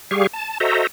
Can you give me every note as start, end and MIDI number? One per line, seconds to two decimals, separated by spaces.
0.11 0.27 55
0.11 0.27 67
0.11 0.27 68
0.11 0.27 77
0.11 0.27 85
0.33 0.58 81
0.60 0.87 66
0.60 0.87 69
0.60 0.87 72
0.60 0.87 75
0.60 0.87 76
0.60 0.87 82